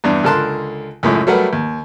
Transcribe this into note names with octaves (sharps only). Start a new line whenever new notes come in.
E2 G2 D4
C#2 D3 A#4 A5 C6 F#6
C#2 F#2 A2
F#3 G3 A3 A#4 B4 F#5
D#2